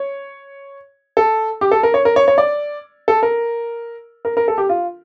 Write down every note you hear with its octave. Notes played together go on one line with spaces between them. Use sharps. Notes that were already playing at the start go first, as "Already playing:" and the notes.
Already playing: C#5
A4
G4
A4
A#4
C#5
A#4
C#5
C#5
D5
A4
A#4
A#4
A#4
A4
G4
F4